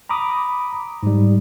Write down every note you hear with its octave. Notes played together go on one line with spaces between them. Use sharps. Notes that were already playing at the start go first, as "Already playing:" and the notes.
A#5 B5 D6 D#6
G#2 G3